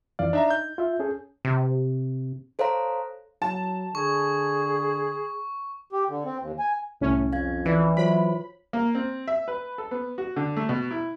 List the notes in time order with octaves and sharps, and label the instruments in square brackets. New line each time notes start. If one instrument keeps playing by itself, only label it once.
[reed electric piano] F2 E3 F5 [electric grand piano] D5
[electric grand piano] D4 E5 A#5 [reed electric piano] D#4
[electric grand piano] G6
[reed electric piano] F4 E5
C#4 G#4 A4
[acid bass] C3
[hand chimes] A4 C5 C#5 F5 A#5
[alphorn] F#3 [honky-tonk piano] A5
[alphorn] D3 [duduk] G#4 [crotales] C#6
[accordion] G4
D3
C4
D#2
G#5
[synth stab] C2 C#4 [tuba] A2
[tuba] F2 [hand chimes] F5 G#6
[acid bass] E3 [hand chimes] E4 B4 D5
[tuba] F#3 [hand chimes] F4 C5 C#5 [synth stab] B5
[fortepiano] A#3
C4
E5
B4
A4
B3
F#4
D3
A3
B2
E4